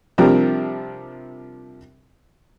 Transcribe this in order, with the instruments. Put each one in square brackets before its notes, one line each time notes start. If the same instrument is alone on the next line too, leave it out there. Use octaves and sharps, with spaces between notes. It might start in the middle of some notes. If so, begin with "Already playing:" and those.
[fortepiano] C3 F3 G3 C4 D4 A#4